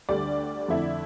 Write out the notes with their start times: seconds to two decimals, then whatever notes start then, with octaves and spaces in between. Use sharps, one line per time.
0.08 D2 D3 G3 D5
0.68 F2 D3 A3 E4